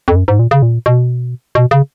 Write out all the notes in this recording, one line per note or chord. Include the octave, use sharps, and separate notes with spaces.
F2
F#2
G#2
A#2
C#3
A#2
B2
B2
C#3